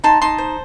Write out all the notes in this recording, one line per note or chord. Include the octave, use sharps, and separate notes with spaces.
D#4 A5 C6
D#4 A5 C6
C5